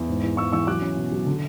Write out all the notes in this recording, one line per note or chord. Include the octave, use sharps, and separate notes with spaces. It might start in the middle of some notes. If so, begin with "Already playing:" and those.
Already playing: E2
G#2
E3
E3 C#6 E6
E3 C#6 E6
F#3 D6 F#6
C#4
B2
F#3
D3